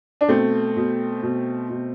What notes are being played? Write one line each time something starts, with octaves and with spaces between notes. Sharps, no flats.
D4
B2 A3 C4
B2
B2
B2